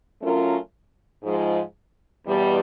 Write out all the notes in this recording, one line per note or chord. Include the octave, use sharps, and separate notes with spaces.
F#3 A3 C#4 F4 A#4
G#2 F3 G#3
E2 B2 G3